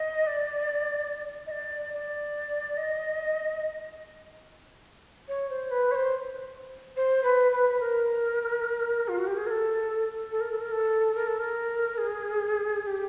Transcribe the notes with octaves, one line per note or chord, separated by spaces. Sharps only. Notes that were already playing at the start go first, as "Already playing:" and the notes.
Already playing: D#5
D5
D#5
D5
D5
D#5
C#5
C5
B4
C#5
C5
C5
B4
B4
B4
A#4
F4
F#4
G4
G#4
A#4
A4
A4
A#4
A4
A#4
A4
A#4
A4
A#4
G#4
G#4
G4